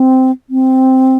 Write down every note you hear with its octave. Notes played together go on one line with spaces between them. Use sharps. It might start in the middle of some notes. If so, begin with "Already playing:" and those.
Already playing: C4
C4